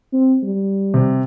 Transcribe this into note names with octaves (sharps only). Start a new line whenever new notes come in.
C4
G3
C3